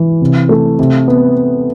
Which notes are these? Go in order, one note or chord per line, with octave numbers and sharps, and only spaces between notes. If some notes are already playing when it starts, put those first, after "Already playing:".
Already playing: E3
C3
A3
C3
B3